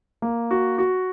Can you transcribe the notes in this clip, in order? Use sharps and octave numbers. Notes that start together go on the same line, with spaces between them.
A#3
F#4
F#4